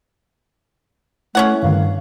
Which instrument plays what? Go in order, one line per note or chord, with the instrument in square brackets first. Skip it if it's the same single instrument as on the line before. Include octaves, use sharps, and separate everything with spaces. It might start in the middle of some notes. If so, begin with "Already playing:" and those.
[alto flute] A3 [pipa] C#4 C#5 F#5 [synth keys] E4
[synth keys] G2 D3 D#3 [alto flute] F5